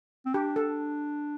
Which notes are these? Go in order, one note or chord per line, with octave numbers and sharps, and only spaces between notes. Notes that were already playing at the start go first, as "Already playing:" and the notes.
C4
D4 G4
A4